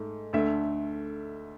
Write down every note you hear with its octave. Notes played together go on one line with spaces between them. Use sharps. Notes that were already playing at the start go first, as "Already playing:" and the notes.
Already playing: G#2 A3
D2 D3 A3 E5